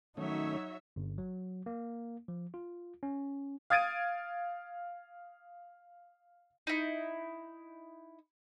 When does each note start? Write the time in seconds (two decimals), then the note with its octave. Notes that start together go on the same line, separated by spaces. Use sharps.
0.17 D#3 F#3 A3 C#4 D#4 F#4 C#5 E5
0.96 G1
1.18 F#3
1.66 A#3
2.28 F3
2.54 F4
3.03 C#4
3.70 F5 D#6 G#6 A6 D7 D#7
6.67 D#4 E4